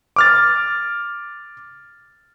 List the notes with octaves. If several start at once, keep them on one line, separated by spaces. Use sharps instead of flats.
D6 F6 A6